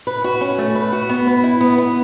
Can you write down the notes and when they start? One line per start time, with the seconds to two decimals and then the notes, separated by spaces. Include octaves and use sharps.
0.07 B4
0.24 F#4
0.41 C#4
0.59 A3
0.75 B4
0.93 F#4
1.09 B3
1.27 B4
1.44 E4
1.61 B3
1.78 B3